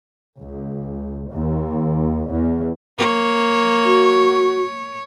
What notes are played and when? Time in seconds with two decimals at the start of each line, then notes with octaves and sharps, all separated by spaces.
0.37 C#2
1.28 D#2
2.27 E2
2.98 A#3 C#5
3.85 F#4